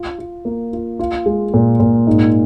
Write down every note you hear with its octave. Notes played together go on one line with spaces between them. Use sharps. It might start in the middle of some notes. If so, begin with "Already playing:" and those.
Already playing: F4
F4
A#3
F4
F4
G#3
A#2
A#2
G#2